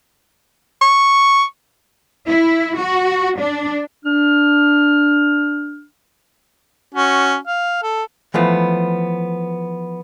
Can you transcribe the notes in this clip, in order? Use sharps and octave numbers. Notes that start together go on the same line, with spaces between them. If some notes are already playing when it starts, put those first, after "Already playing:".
C#6
E4
F#4
D4
D4 F6
C#4 F#4
F5
A4
E3 F3 A3 B3